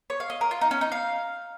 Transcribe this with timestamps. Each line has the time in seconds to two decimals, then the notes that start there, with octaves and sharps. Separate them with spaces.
0.10 C#5
0.20 F5
0.30 D#5
0.41 A#4
0.51 F4
0.61 D#4
0.71 C#4
0.81 D#4
0.92 F5